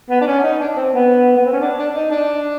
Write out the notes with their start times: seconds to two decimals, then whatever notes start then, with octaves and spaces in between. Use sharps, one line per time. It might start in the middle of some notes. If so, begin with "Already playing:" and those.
0.10 B3
0.21 D4
0.27 C#4
0.43 D#4
0.60 D4
0.76 C4
0.94 B3
1.36 B3
1.45 C4
1.53 C#4
1.60 D4
1.77 D4
1.95 D#4
2.11 D4